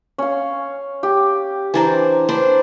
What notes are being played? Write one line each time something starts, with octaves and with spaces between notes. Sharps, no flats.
C#4 F5
G4
E3 D4 C5 G#5 A#5
D4 B4 C5